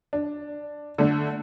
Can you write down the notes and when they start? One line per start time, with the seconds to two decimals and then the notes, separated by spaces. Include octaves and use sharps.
0.13 D4
0.98 D3 A3 D4